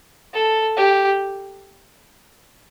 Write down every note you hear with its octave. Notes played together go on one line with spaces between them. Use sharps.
A4
G4